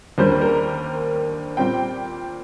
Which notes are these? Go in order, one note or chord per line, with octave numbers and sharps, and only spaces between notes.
D#2 D3 G3 A#3 C5
A#4
A#2 G3 C4 G5